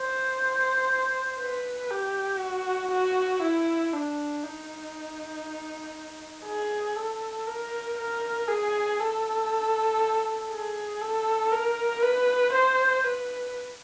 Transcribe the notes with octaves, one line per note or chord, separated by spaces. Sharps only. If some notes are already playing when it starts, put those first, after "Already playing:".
Already playing: C5
B4
G4
F#4
F#4
E4
D4
D#4
G#4
A4
A#4
A#4
G#4
A4
G#4
A4
A#4
B4
C5
B4